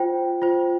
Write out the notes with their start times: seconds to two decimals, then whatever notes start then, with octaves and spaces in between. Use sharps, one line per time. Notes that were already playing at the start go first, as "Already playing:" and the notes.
Already playing: F4 C5 G5
0.42 F4 C5